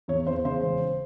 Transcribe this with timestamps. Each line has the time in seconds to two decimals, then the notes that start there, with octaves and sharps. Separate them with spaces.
0.08 E2 C#5
0.27 E2 C5
0.45 C#3 C5
0.62 E1